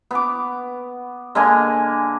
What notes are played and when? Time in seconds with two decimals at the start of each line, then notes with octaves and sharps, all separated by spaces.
0.11 B3 D6
1.35 D3 G#3 A#3 G#5